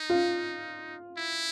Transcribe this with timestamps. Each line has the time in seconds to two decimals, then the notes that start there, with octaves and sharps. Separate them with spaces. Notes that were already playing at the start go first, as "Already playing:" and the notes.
Already playing: D#4
0.10 F4
1.18 E4